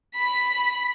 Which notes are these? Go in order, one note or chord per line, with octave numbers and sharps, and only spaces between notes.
B5 B6